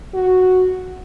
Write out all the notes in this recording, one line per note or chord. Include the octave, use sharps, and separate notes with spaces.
F#4